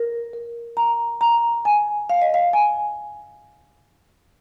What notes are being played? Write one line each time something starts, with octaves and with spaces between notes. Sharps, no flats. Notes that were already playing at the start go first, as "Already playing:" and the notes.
Already playing: A#4
A#4
A#5
A#5
G#5
F5
D#5
F5
G#5